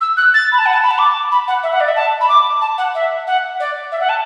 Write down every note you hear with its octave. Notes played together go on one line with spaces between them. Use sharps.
E6
F#6
A6
B5
A5
F#5
A5
B5
A5
D6
B5
F#5
E5
F#5
D5
E5
A5
B5
D6
A5
F#5
E5
F#5
D5
E5
F#5
A5